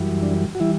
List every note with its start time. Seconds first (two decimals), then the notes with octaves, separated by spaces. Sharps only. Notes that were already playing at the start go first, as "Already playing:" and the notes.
Already playing: F#2 E3 G3
0.23 D4
0.55 F#4
0.60 E3 G3 E4